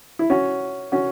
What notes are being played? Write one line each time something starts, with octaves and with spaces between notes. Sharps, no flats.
E4
C#4 F#4
C#4 F#4